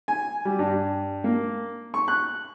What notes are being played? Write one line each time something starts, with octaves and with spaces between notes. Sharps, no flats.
G#5
G3
G2
A#3
C#6
F#6